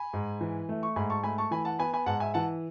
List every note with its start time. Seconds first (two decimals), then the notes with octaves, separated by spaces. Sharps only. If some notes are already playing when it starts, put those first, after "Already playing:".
Already playing: G#5 B5
0.13 G#2
0.41 E3
0.69 A3
0.83 C#6
0.96 G#2 G#5 B5
1.10 A5 C#6
1.24 A3 G#5 B5
1.38 A5 C#6
1.51 E3 G#5 B5
1.65 F#5 A5
1.79 B3 G#5 B5
1.93 G#5 B5
2.06 G#2 F#5 A5
2.20 E5 G#5
2.34 E3 F#5 A5